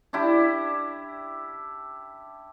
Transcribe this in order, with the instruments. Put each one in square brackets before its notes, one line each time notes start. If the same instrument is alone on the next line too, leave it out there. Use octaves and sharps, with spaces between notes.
[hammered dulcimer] D4 E4 G4